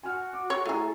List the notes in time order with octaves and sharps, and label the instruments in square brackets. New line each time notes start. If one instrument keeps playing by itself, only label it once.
[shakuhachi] F#4 [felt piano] G#5 F6
[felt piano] D6
[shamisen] C#5
[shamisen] A3 G#4 [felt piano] E4 A#5
[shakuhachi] A4